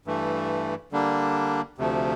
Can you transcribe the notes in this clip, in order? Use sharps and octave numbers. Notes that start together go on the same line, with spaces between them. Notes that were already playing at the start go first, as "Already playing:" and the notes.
G2 E3 A3
D3 G3 A#3 D4
D2 C3 F3 A3